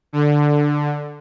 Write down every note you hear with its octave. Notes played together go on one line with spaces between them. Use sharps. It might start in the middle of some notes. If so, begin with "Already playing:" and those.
D3